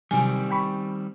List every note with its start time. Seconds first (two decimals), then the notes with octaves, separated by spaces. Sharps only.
0.11 C3 D#3 F#3 G3 C4 G#5
0.51 G5 B5 C#6